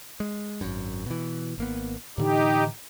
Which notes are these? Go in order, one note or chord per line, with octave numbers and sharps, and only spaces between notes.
G#3
G#1 F#2
B2 E3
G#1 A#3 B3
A2 D3 E3 D#4 G4